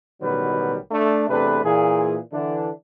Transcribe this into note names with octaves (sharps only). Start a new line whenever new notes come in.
A1 B2 D#3 F#3 G3 B4
A3 D4
E2 C3 A3 D4 B4
A#2 E3 G#4
D3 E3 D4